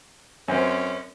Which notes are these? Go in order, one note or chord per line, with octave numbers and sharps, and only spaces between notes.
F#2 C4 C#4